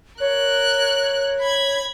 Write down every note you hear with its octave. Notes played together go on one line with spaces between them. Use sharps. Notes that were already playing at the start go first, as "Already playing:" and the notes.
A#4 C#5 F#6
B5 G#6